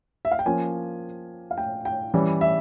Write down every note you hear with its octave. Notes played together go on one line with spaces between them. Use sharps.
E5
F5
G5
F3 A#3 C#4 G#5
F5
G5
G5
E3 G3 C#4
E5